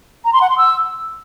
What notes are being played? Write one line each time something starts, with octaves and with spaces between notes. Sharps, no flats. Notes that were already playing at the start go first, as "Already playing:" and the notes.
A#5
C6
F#5
C6
E6